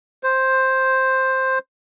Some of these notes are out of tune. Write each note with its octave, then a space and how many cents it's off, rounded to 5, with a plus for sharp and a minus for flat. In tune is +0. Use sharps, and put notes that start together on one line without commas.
C5 +5